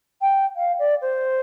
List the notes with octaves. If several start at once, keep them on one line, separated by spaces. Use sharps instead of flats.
G5
F5
D5
C5